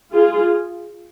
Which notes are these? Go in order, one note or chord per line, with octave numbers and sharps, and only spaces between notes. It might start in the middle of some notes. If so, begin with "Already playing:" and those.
F4 G#4